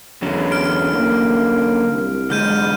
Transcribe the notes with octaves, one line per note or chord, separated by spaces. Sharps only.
E2 D3 F#3 C#4
F6 D7
A#3
C2
G#2 D3 G#3 F6 G6 D#7